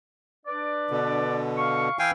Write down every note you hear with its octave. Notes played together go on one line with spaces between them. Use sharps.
D4 B4 D5
B2 D3
F5 C#6
E3 E4 F5 G5 G#5